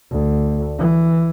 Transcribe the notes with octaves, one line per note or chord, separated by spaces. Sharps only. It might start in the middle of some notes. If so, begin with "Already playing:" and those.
D2
E3